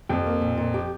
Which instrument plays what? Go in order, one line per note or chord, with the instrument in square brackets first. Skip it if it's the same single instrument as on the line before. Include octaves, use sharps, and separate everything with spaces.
[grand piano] F2 [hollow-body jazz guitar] G4
[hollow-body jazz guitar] A#3
A#2
A#2
G4